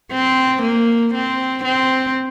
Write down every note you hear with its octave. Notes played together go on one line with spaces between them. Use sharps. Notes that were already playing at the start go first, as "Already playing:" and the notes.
C4
A#3
C4
C4